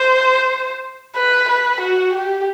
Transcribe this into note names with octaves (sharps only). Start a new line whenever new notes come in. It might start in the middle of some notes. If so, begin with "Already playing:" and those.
Already playing: C5
B4
B4
F#4
G4